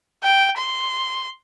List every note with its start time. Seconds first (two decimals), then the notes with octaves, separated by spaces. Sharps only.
0.23 G5
0.56 C6